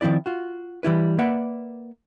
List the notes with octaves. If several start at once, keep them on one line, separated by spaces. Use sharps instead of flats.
D#3 F3 C4 E4 D5
F4 F#4
E3 G3 E4 B4
A#3 B4 D5 E5 F#5